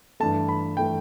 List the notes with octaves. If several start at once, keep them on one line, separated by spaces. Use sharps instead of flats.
G2 E3 A3 A5
B5
E3 A3 G5